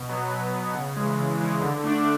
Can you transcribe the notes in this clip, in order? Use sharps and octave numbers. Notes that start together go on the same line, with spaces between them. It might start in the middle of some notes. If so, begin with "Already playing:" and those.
Already playing: B2
F#3 B3
B2
F#3 B3
C#3
E3 G#3
C#3
E3 G#3
D3
A3 D4